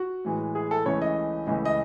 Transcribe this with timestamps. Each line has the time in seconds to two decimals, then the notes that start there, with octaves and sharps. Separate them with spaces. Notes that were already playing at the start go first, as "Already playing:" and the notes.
Already playing: F#4
0.25 A2 E3 G#3
0.55 G#4
0.71 A4
0.86 C#2 C#3 E3 A3 C#5
1.02 D#5
1.47 C#2 C#3 E3 A3
1.65 D#5